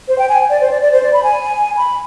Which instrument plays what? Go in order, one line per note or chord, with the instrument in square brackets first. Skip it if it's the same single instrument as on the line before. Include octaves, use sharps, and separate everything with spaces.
[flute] C5
G5
G#5
D5
C5
D5
D5
C5
D5
B5
G#5
B5